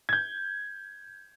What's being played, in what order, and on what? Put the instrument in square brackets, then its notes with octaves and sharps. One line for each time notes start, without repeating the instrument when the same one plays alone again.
[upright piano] G6 G#6